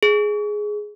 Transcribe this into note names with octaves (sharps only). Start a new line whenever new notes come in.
G#4